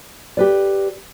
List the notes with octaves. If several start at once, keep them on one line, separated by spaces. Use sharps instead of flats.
G4 B4 D5